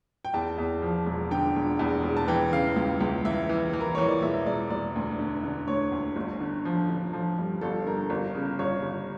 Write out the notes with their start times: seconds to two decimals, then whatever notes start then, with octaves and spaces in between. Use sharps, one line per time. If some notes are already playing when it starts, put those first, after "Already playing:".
0.25 G5
0.34 E2 A5
0.58 E2
0.82 F3
1.06 E1
1.31 D3 G5
1.56 E1
1.79 E2
2.04 E1
2.17 A5
2.28 E3 G5
2.52 C#3 F5
2.76 C#2
3.01 C#2
3.25 E3 E5
3.49 E3
3.73 E3
3.81 A#4
3.95 E3 C#5
4.08 D5
4.22 E1 E5
4.46 E1 D5
4.70 E1 D5
4.96 D2
5.19 D3
5.43 D3
5.68 D2 C#5
5.92 D2
6.16 G1
6.41 D3
6.65 F3
6.89 D3
7.13 F3
7.38 G2
7.61 G1 A4
7.86 G2 A#4
8.10 G1
8.35 C#3
8.59 G1 C#5
8.83 G1